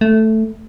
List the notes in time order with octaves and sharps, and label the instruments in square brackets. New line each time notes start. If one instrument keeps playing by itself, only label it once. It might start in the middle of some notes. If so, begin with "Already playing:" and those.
[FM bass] A3